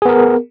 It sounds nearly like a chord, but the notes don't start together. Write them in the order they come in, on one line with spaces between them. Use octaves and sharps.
G#4 B3 A#4